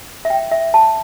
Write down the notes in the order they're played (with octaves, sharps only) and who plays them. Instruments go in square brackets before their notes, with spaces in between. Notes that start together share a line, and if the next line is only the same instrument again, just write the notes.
[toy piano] E5
G5
E5
A5